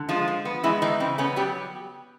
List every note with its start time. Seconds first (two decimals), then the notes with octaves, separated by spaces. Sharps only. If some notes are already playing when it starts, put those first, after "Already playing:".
Already playing: D3
0.09 F3 G#3 F4
0.28 F3
0.45 B3
0.63 E3 G#3 E4
0.82 D#3 E3 D#4
1.00 C#3 C4
1.18 C#3 B3 C#4
1.36 F#3 G3 G4